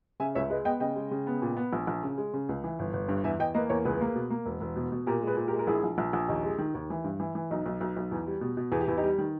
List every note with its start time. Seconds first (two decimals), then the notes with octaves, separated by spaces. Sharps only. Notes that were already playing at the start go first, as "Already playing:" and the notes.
0.20 C#3 E5 G#5
0.35 C#2 C#5 E5
0.50 G#3 B4 D#5
0.65 B3 D#5 G5
0.80 C#3 D#5 G5
0.96 G#3
1.11 C#3
1.27 B3
1.42 A#2
1.57 B3
1.73 A#1
1.87 A#1
2.03 C#3
2.18 G#3
2.34 C#3
2.49 C#2
2.64 E3
2.79 G1
2.93 G1
3.08 G2
3.24 E2 E5 G#5
3.39 E2 D#5 G5
3.54 A#3 B4 D#5
3.70 E2 A#4 C#5
3.85 C#2 G#4 B4
4.01 A#3
4.15 B2
4.30 A#3
4.46 E1
4.61 E1
4.76 B2
4.92 B2
5.06 A#2 G4 A#4
5.22 G#3
5.27 G#4 B4
5.37 A#2
5.48 G4 A#4
5.53 G#3
5.59 A#4
5.67 A#1 E4 G#4
5.83 A#1
5.98 A#1
6.13 A#1
6.28 D#2 D#4 G4
6.44 G#3
6.59 D#3
6.74 D#2
6.90 E3
7.04 G2
7.20 E3
7.35 E3
7.51 B1 D#4
7.66 B1
7.81 B1
7.97 B1
8.12 E2
8.27 G3
8.41 B2
8.57 B2
8.72 E2 G#4
8.81 G4
8.88 E2 E4
8.97 D#4 G4
9.03 G3
9.18 D#3